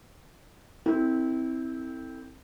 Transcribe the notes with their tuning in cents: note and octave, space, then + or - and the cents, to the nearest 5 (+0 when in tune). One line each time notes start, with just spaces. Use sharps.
C4 +0 E4 -25 A4 +25